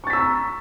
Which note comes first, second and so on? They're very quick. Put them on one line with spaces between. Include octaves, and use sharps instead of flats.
C#6 A6 B6 E6 A#5